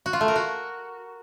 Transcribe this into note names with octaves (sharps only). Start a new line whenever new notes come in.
F#4
F4
A3
A#4
F#4